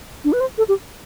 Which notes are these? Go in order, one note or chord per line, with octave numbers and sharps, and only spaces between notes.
D4
B4
C5
A4
G4